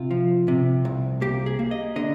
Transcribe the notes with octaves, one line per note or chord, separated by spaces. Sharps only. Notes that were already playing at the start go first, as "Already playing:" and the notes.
Already playing: C3 F4
F3
C3
C2
A#3 G4
G#4
A#3
D#5
D3 D#5